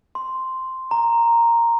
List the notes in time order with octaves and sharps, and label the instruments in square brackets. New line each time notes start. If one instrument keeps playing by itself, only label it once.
[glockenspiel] C6
A#5